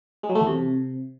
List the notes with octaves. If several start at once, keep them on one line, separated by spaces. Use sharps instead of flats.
G#3
F#3
A3
E2
C3